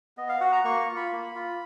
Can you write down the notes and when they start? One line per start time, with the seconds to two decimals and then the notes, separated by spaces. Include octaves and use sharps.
0.17 B3 D#5
0.29 F5
0.41 F#4 F#5
0.52 A#5
0.64 A#3 C#6
0.80 C#6
0.88 F4
0.96 B5
1.12 A#3
1.35 F4